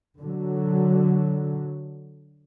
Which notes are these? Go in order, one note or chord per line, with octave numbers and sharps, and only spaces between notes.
D3 F#3